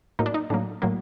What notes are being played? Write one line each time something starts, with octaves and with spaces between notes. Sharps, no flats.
A2 F#3 A#3 D#4
D4
D#4
A2 F#3 A#3 D4
A2 F#3 A#3